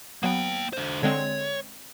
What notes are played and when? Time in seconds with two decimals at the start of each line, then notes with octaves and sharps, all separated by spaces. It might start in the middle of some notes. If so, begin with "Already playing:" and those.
0.23 F#3 A#3 B3 G5
0.73 D3 C5
1.03 D3 G#3 C4 C#5